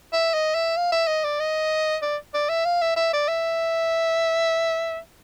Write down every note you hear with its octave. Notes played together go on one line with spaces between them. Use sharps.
E5
D#5
E5
F5
E5
D#5
D5
D#5
D5
D5
E5
F5
E5
E5
D5
E5